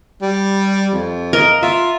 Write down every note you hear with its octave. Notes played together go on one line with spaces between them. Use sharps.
G3
F2
A#4 D#5
F4 E5